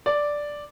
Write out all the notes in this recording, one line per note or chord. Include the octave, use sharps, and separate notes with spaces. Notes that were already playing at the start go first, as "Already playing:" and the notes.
D5